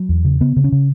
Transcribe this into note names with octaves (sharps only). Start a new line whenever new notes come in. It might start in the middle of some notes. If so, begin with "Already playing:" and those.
Already playing: F#3
E2
C#3
C#3 B3
C#3
C#4
C#3